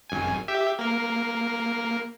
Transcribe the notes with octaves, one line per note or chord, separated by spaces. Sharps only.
G#1 F#2 G#5
G4 E5
A#3 A#4